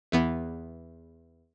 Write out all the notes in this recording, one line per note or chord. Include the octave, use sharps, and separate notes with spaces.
E2 E3 B3